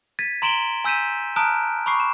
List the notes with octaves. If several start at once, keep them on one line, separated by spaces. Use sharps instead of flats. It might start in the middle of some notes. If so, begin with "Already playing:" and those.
G#6 A6 B6 D#7
A#5 C6 D7 E7 F#7 G7
G#5 E6 G6 B6 D#7 E7
A5 A#5 D#6 F6 F#6 D7
B5 C#6 D6 C7
E7